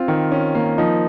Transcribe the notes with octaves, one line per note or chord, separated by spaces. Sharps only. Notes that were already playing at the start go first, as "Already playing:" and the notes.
Already playing: C4 F4
D#3
C#4
A#3
F3 D#4